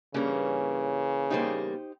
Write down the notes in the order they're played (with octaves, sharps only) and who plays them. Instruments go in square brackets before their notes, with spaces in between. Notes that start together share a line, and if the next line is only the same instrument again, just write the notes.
[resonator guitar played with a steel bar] G2 G3 C#4 [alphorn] C#3 [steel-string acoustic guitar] E3 A#3
[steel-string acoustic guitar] E2 G3 A#3 [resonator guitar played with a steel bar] D#4 G4 C5